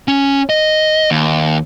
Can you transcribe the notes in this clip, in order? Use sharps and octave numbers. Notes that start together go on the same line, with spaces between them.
C#4
D#5
D#2